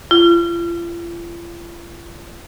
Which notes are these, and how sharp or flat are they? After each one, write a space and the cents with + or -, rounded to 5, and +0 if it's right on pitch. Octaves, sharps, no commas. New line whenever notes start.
F4 -40